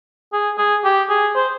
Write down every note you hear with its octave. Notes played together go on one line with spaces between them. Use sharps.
G#4
G#4
G4
G#4
C5